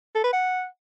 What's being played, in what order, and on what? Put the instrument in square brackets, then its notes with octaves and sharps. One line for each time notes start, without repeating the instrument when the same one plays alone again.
[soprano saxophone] A4
B4
F#5